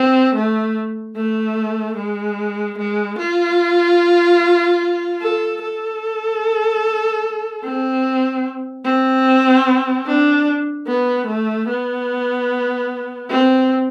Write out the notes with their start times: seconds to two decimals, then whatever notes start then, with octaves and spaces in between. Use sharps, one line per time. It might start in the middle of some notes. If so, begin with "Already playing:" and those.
Already playing: C4
0.35 A3
1.16 A3
1.97 G#3
2.78 G#3
3.19 F4
5.21 A4
5.62 A4
7.64 C4
8.85 C4
10.06 D4
10.87 B3
11.27 A3
11.69 B3
13.30 C4